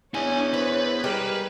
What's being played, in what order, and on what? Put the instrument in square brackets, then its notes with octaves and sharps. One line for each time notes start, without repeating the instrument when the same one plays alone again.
[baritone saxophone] E2 [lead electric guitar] D4 G#5 [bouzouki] D#4 [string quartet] C#5
[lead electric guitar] B4 [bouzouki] C5
[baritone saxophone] G3 [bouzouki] G#3 G4 A#4